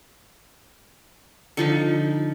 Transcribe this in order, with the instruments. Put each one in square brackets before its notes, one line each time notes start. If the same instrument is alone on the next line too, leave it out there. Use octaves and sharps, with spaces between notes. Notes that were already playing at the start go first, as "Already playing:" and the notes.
[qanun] D3 F3 D#4